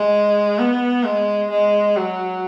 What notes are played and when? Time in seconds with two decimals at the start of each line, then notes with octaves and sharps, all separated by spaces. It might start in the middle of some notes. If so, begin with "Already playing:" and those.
Already playing: G#3
0.59 B3
1.04 G#3
1.50 G#3
1.96 F#3